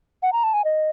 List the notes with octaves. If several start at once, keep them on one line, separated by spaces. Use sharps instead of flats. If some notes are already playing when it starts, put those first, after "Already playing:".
F#5
A#5
A5
G#5
D#5